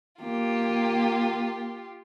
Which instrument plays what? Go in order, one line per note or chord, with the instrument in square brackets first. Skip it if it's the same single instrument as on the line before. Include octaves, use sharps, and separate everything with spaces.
[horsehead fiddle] A#3 [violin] F4 G4